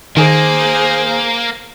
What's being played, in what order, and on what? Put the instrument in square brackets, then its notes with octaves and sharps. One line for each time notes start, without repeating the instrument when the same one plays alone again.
[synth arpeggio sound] D#3 [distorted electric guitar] A#3 [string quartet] G#4 C5